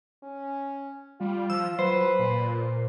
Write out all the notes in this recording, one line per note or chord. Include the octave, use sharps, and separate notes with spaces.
C#4
G3 F4
F3 E6
F#3 B4 C5
A#2